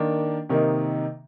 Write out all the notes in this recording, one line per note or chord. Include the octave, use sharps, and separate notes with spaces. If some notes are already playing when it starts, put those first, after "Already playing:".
Already playing: D#3 A#3 D4
C3 D#3 A#3 D#4